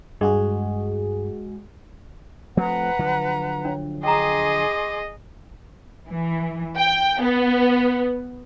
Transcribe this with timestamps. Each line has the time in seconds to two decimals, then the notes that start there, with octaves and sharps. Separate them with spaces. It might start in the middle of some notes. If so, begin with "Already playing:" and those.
0.21 G2 G#3 F#4 G#4
2.57 F3 A3 C4 B4 F#5 A#5
2.99 D3 F3 F#3
3.65 D4 C#5
4.03 G#4 D#5 G5 A#5 C6 D6
6.08 E3
6.77 G5
7.21 B3